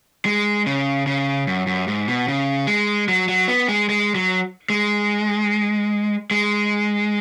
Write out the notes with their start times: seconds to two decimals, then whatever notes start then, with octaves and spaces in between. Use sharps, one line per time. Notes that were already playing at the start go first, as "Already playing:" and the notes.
0.26 G#3
0.66 C#3
1.07 C#3
1.47 F#2
1.67 F#2
1.88 G#2
2.08 B2
2.28 C#3
2.67 G#3
3.08 F#3
3.29 F#3
3.48 B3
3.69 G#3
3.89 G#3
4.15 F#3
4.70 G#3
6.31 G#3